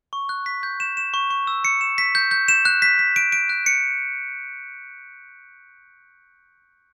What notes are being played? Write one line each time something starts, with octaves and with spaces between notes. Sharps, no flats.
C#6
F#6
B6
G6
E7
E7
C#6
C#6
E6
C#7
E7
B6
G6
G6
E7
F#6
B6
B6
D7
D7
F#6
C#7